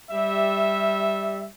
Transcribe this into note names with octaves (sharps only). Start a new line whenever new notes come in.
G3 E5